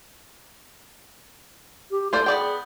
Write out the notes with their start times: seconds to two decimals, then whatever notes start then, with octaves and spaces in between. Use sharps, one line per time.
1.91 G4
2.13 A3 F4 C5 D5
2.26 B3 G#4 D5 G5